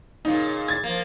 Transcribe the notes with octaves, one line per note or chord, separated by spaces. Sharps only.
A#2 C#3 D#4
G#6 A6
F3 A#3